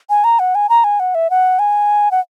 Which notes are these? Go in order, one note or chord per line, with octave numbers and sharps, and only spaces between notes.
G#5
A#5
F#5
G#5
A#5
G#5
F#5
E5
F#5
G#5
F#5